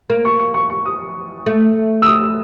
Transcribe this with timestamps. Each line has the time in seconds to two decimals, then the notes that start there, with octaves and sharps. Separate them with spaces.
0.10 A#3
0.25 C#6
0.39 C#6
0.54 C#6
0.70 C#6
0.85 D#6
1.46 A3
2.02 E6
2.06 D#6